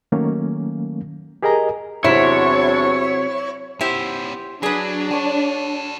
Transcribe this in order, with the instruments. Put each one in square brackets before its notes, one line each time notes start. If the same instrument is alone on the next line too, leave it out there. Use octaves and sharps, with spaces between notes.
[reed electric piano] D#3 F#3 A3 A#3 C#4
G4 G#4 A#4 D#5 G#5 A#5
[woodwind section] E2 D4 C#6 [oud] C3 F#3 [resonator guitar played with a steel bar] E4 [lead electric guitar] C#5
[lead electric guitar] B3 C#4 [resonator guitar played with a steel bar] E4 G4 C5
[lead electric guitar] F#3 [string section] D4 [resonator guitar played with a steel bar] G#4 B4
[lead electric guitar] F#4 A4 [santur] C#5 G#5